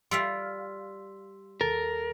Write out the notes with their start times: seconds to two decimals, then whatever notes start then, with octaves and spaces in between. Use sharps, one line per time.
0.11 G3 F4 F5 C6 E6 B6
1.61 D#2 A4 A#4 A6